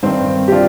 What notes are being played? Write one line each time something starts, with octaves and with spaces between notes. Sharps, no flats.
G2 D#3 C4
G4
D4 F4